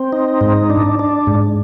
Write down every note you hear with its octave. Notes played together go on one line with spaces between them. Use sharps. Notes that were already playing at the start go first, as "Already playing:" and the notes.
Already playing: C4
D#4
G#2
D4
D4
G#2